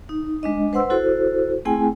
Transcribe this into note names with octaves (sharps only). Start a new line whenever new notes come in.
D#4
G#3 D4 D#5
B4 C5 F#5 C6 E6
E4 F#4 A4 C5
A3 C4 E4 G#4 G5 G#5